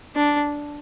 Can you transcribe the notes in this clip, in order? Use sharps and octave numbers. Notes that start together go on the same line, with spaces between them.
D4